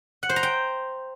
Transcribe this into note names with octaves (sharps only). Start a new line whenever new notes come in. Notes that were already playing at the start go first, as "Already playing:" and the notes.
F#5
C5
A#5
G5